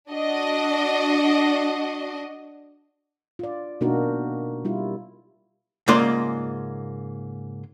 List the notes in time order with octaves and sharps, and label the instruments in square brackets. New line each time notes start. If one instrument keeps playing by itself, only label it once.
[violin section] D4 F#4 D#5
[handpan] F4 D5
B2 A#3 D4 D#4 F#4 A#4
G3 E4 F4
[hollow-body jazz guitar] G#2 C#3 A#3 F4 D5 C6